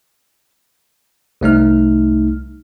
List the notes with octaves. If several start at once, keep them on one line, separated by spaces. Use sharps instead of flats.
C2 A3 D#4 F6